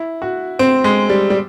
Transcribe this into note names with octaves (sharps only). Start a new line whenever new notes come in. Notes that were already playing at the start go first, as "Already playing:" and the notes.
Already playing: E4
F#4
C4
G#3
G3
G3